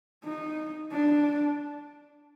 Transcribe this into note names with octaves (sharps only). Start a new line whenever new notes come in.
D#4
D4